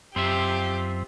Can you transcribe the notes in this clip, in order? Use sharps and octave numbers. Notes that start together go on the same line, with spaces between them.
F#2 C4 F4 G4 E5